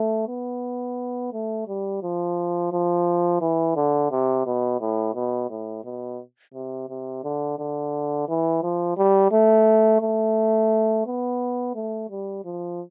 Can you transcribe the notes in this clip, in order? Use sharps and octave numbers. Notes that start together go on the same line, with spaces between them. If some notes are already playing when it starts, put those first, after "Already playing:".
Already playing: A3
B3
A3
G3
F3
F3
E3
D3
C3
B2
A2
B2
A2
B2
C3
C3
D3
D3
E3
F3
G3
A3
A3
B3
A3
G3
F3